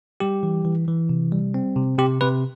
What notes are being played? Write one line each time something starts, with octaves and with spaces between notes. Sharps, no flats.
G3 G4
E3
E3
E3
C3
G3
C4
C3
C3 G4
C3 B4